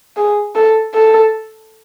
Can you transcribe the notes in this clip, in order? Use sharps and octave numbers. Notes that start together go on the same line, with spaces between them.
G#4
A4
A4